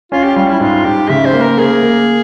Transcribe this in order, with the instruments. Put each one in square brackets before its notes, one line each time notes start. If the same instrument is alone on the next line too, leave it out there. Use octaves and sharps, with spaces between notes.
[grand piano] C#4 [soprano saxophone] F4
[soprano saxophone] G4
[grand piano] G3 [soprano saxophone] F4
[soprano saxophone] E4
[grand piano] G#2 [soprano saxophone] F4
[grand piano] G#2 [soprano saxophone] G4
[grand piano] C#3 [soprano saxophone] E5
[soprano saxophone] C5
[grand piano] A#3
[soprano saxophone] A#4
[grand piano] A#3 [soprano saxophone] G#4
[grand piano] A#3